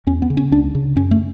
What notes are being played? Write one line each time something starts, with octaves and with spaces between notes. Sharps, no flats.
E2 C#4
B3
C#3
C#4
C#2 D4
C#3
F#2 C#4
A3